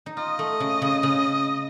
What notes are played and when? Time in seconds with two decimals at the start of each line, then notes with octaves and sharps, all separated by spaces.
0.06 D#4
0.17 F4 D#5
0.39 A3
0.60 C#3
0.82 C#3
1.03 C#3